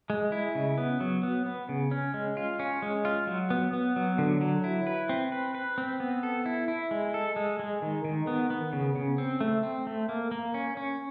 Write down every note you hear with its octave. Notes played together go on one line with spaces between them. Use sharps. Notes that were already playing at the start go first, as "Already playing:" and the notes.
G#3
E4
C#3
B3
F#3
B3
B3
C#3
C#4
G#3
F4
C#4
G#3
F4
F#3
B3
B3
F#3
D3
F#3
E4
B4
C4
B4
B4
C4
B3
A4
E4
E4
G#3
A4
G#3
G#3
D#3
D#3
B3
B3
C#3
C#3
C4
A3
C4
A3
A#3
A#3
C#4
C#4